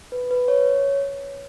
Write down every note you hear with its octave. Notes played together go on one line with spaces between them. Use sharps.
B4
B4
C#5